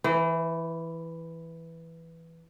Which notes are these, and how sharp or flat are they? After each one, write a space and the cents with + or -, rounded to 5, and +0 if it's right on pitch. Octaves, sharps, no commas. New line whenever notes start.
E3 +0 C5 -40